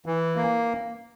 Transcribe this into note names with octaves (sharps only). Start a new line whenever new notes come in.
E3
A#3